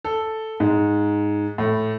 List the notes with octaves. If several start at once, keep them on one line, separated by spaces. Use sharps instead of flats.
A4
G#2
A2